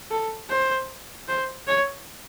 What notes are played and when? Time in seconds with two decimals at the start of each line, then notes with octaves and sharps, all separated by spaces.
0.11 A4
0.50 C5
1.28 C5
1.67 C#5